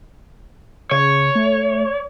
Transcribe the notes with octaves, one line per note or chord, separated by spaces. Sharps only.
C#3 C#5
A3